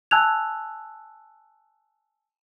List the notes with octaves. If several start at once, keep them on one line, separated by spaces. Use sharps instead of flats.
G#5 A5 E6 F#6 G#6 F7